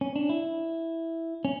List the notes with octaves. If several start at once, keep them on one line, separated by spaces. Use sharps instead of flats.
C#4
D4
E4
C#4